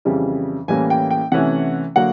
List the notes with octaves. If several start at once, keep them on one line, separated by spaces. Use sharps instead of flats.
F2 C#3 E3 G3
A2 E3 G3 A#3 C#4 G#5
G5
G5
C3 E3 A3 C#4 F#5
D3 F#3 A#3 F#5